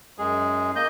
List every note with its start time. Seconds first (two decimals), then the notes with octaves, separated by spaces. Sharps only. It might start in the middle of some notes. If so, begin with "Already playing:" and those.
0.18 F#2 G#3 G#4
0.76 A#3 D#5 G6